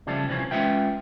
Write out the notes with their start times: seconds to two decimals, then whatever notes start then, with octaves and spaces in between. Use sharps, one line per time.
0.07 C#3 F3 G3 A3 D4
0.28 C2 C3 E3 F3 C#4
0.51 G#3 C#4 F4 B4 E5 G5